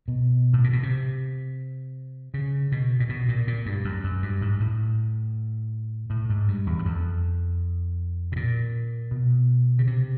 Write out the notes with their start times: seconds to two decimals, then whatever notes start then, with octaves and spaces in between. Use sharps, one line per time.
0.08 B2
0.53 A2
0.64 A#2
0.73 B2
0.83 C3
2.34 C#3
2.72 B2
3.00 A#2
3.09 B2
3.28 A#2
3.47 A#2
3.66 G2
3.85 F#2
4.04 F#2
4.22 G2
4.41 G#2
4.60 A2
6.10 A2
6.30 G#2
6.48 G2
6.67 E2
6.79 F#2
6.85 F2
8.32 B2
8.36 A#2
9.11 B2
9.79 C#3
9.87 C3